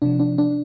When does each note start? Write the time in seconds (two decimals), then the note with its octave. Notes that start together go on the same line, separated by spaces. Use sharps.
0.02 C3 F3 D4
0.20 D4
0.38 D4